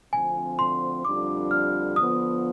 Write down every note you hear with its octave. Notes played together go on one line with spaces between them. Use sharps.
D2 D3 F3 C4 G#5
C6
F2 D3 G3 D4 F4 D6
F6
D3 F3 B3 F4 D#6